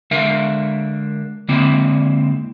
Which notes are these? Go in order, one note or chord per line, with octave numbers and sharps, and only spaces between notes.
D3 G#3 A#4 E5 F5
D3 G#3 A#3 C4 E4